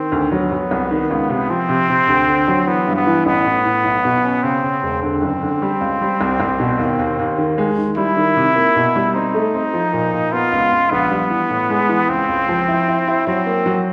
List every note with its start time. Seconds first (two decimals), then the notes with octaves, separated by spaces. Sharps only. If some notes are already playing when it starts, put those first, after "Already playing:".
Already playing: D#3 C4
0.12 D2
0.32 F#3 B3
0.52 F#3
0.71 C2
0.91 D#3
1.10 C#2
1.29 C3
1.50 F3 C4
1.69 C3
1.89 C3
2.08 D2
2.27 D3
2.48 F#3
2.67 E3 B3
2.87 G2
2.97 B3
3.07 E3
3.26 A1 B3
3.45 A2
3.65 A2
3.84 B1
4.05 B2
4.24 C#4
4.43 C#3 C4
4.63 C#3
4.83 E1
5.02 D3 C4
5.22 F#1
5.42 D3
5.62 G3
5.81 C#2
6.01 G3
6.21 C2
6.40 C2
6.60 B2
6.79 D#2
6.99 D#2
7.19 D#2
7.38 D#3
7.58 G#3
7.78 D#3
7.97 G3 E4
8.17 D#3
8.36 C3
8.56 A#3
8.76 B2
8.96 G3
9.14 C4 D#4
9.34 A3
9.54 C4
9.74 F3
9.93 A#2
10.13 A#2
10.32 B3 F4
10.52 C#2
10.72 C#2
10.91 A#1 B3
11.11 G3
11.30 E3
11.50 A2
11.70 G#3
11.89 E3
12.09 C#2 C4
12.29 C#2
12.49 F3
12.68 E4
12.88 E4
13.08 E4
13.27 F#3 C4
13.46 A#3
13.66 F#3